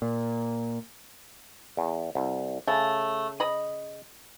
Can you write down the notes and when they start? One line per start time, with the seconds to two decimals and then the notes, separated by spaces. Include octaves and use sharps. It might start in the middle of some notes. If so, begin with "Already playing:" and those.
0.02 A#2
1.77 E2
2.15 C2
2.68 C#3 A3
3.40 D#5 B5